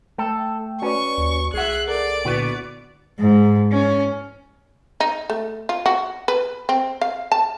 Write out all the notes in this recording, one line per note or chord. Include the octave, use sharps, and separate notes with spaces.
A3 A4 G5
C#4 F#4 B4 D5 C#6
D#2
C2 G#4 E5 F#5 F#6
A4 A#4 D5
A#2 D3 B3 E4 F#4 B4
G#2
C#4
D#4
A3
F4
F#4
B4
C4
F5
A5